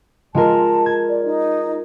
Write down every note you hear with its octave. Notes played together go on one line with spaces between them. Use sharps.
G#3 F4 A#4 A5
G#6
D5
D#4